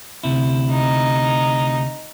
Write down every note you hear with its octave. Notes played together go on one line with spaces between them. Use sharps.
D2 C3 E4
D#4